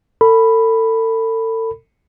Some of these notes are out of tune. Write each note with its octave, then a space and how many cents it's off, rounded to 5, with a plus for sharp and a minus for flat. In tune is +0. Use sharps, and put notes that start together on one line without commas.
A4 +40 B5 +0